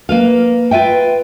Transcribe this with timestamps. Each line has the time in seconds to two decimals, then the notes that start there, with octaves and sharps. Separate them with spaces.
0.09 A#3 B4 F5
0.71 F4 B4 E5 G5